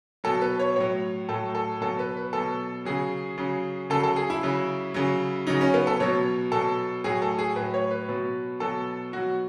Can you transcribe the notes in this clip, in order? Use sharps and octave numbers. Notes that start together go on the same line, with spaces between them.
B2 F#3 A4
B4
C#5
A2 F#3 C#5
A2 F#3 A4
A4
B2 F#3 A4
B4
B4
B2 F#3 A4
C#3 F#3 G#4
C#3 F#3
C#3 F#3 A4
A4
G#4
E4
C#3 F#3
C#3 F#3
C#3 F#3 D#4
C#4
B3
A4
B2 F#3 C#5
B2 F#3 A4
A2 F#3 G#4
A4
G#4
A2 F#3 B4
C#5
B4
B2 F#3
B2 F#3 A4
B2 F#3 F#4